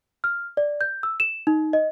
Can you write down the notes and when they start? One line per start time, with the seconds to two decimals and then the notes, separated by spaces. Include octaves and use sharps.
0.24 F6
0.57 D5
0.81 G6
1.03 E6
1.20 E7
1.47 D#4
1.73 D#5